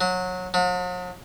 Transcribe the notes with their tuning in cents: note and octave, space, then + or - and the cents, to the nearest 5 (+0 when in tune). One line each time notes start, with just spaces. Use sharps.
F#3 -20
F#3 -45